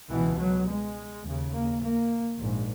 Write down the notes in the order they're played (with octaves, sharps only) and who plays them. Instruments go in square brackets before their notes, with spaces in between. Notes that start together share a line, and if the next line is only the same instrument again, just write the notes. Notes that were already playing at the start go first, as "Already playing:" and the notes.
[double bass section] C#2 B2 E3
F#3
G#3
D#2 C#3
A#3
A#3
A#1 G#2